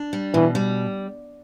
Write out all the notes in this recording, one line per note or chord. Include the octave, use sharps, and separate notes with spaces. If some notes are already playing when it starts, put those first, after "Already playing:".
Already playing: D4
G3
B2 E3
G3